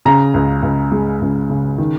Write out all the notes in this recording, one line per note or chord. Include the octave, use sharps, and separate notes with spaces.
C#3 A#5
C#2
C#2
G#3
C#2
C#3
D#3